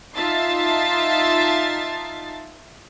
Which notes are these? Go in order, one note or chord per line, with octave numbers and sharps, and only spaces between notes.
D#4 F4 E5 A5 A6 C7